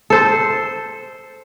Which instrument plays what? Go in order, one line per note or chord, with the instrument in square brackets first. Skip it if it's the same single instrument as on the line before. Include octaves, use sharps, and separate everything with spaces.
[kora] A4 C5